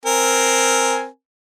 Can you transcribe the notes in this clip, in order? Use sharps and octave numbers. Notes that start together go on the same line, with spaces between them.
C4 A#4 G#5